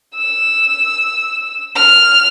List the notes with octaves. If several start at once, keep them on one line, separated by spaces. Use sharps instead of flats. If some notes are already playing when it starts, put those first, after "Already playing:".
E6
F6